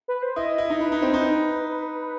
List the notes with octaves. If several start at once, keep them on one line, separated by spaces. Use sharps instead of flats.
B4
C5
E4 D#5
E4
D#4
E4 B4
D#4
C4
D#4